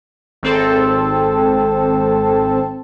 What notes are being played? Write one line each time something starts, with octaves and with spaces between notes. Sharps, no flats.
G#1 C4 A4